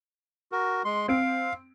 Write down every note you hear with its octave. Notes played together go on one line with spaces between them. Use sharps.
F#4 A#4
G#3 C6
C4 F5 D7